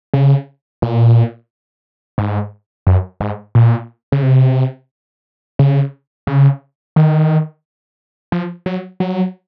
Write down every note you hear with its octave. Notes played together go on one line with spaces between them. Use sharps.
C#3
A#2
G#2
F#2
G#2
A#2
C#3
C3
C#3
C#3
D#3
F3
F#3
F#3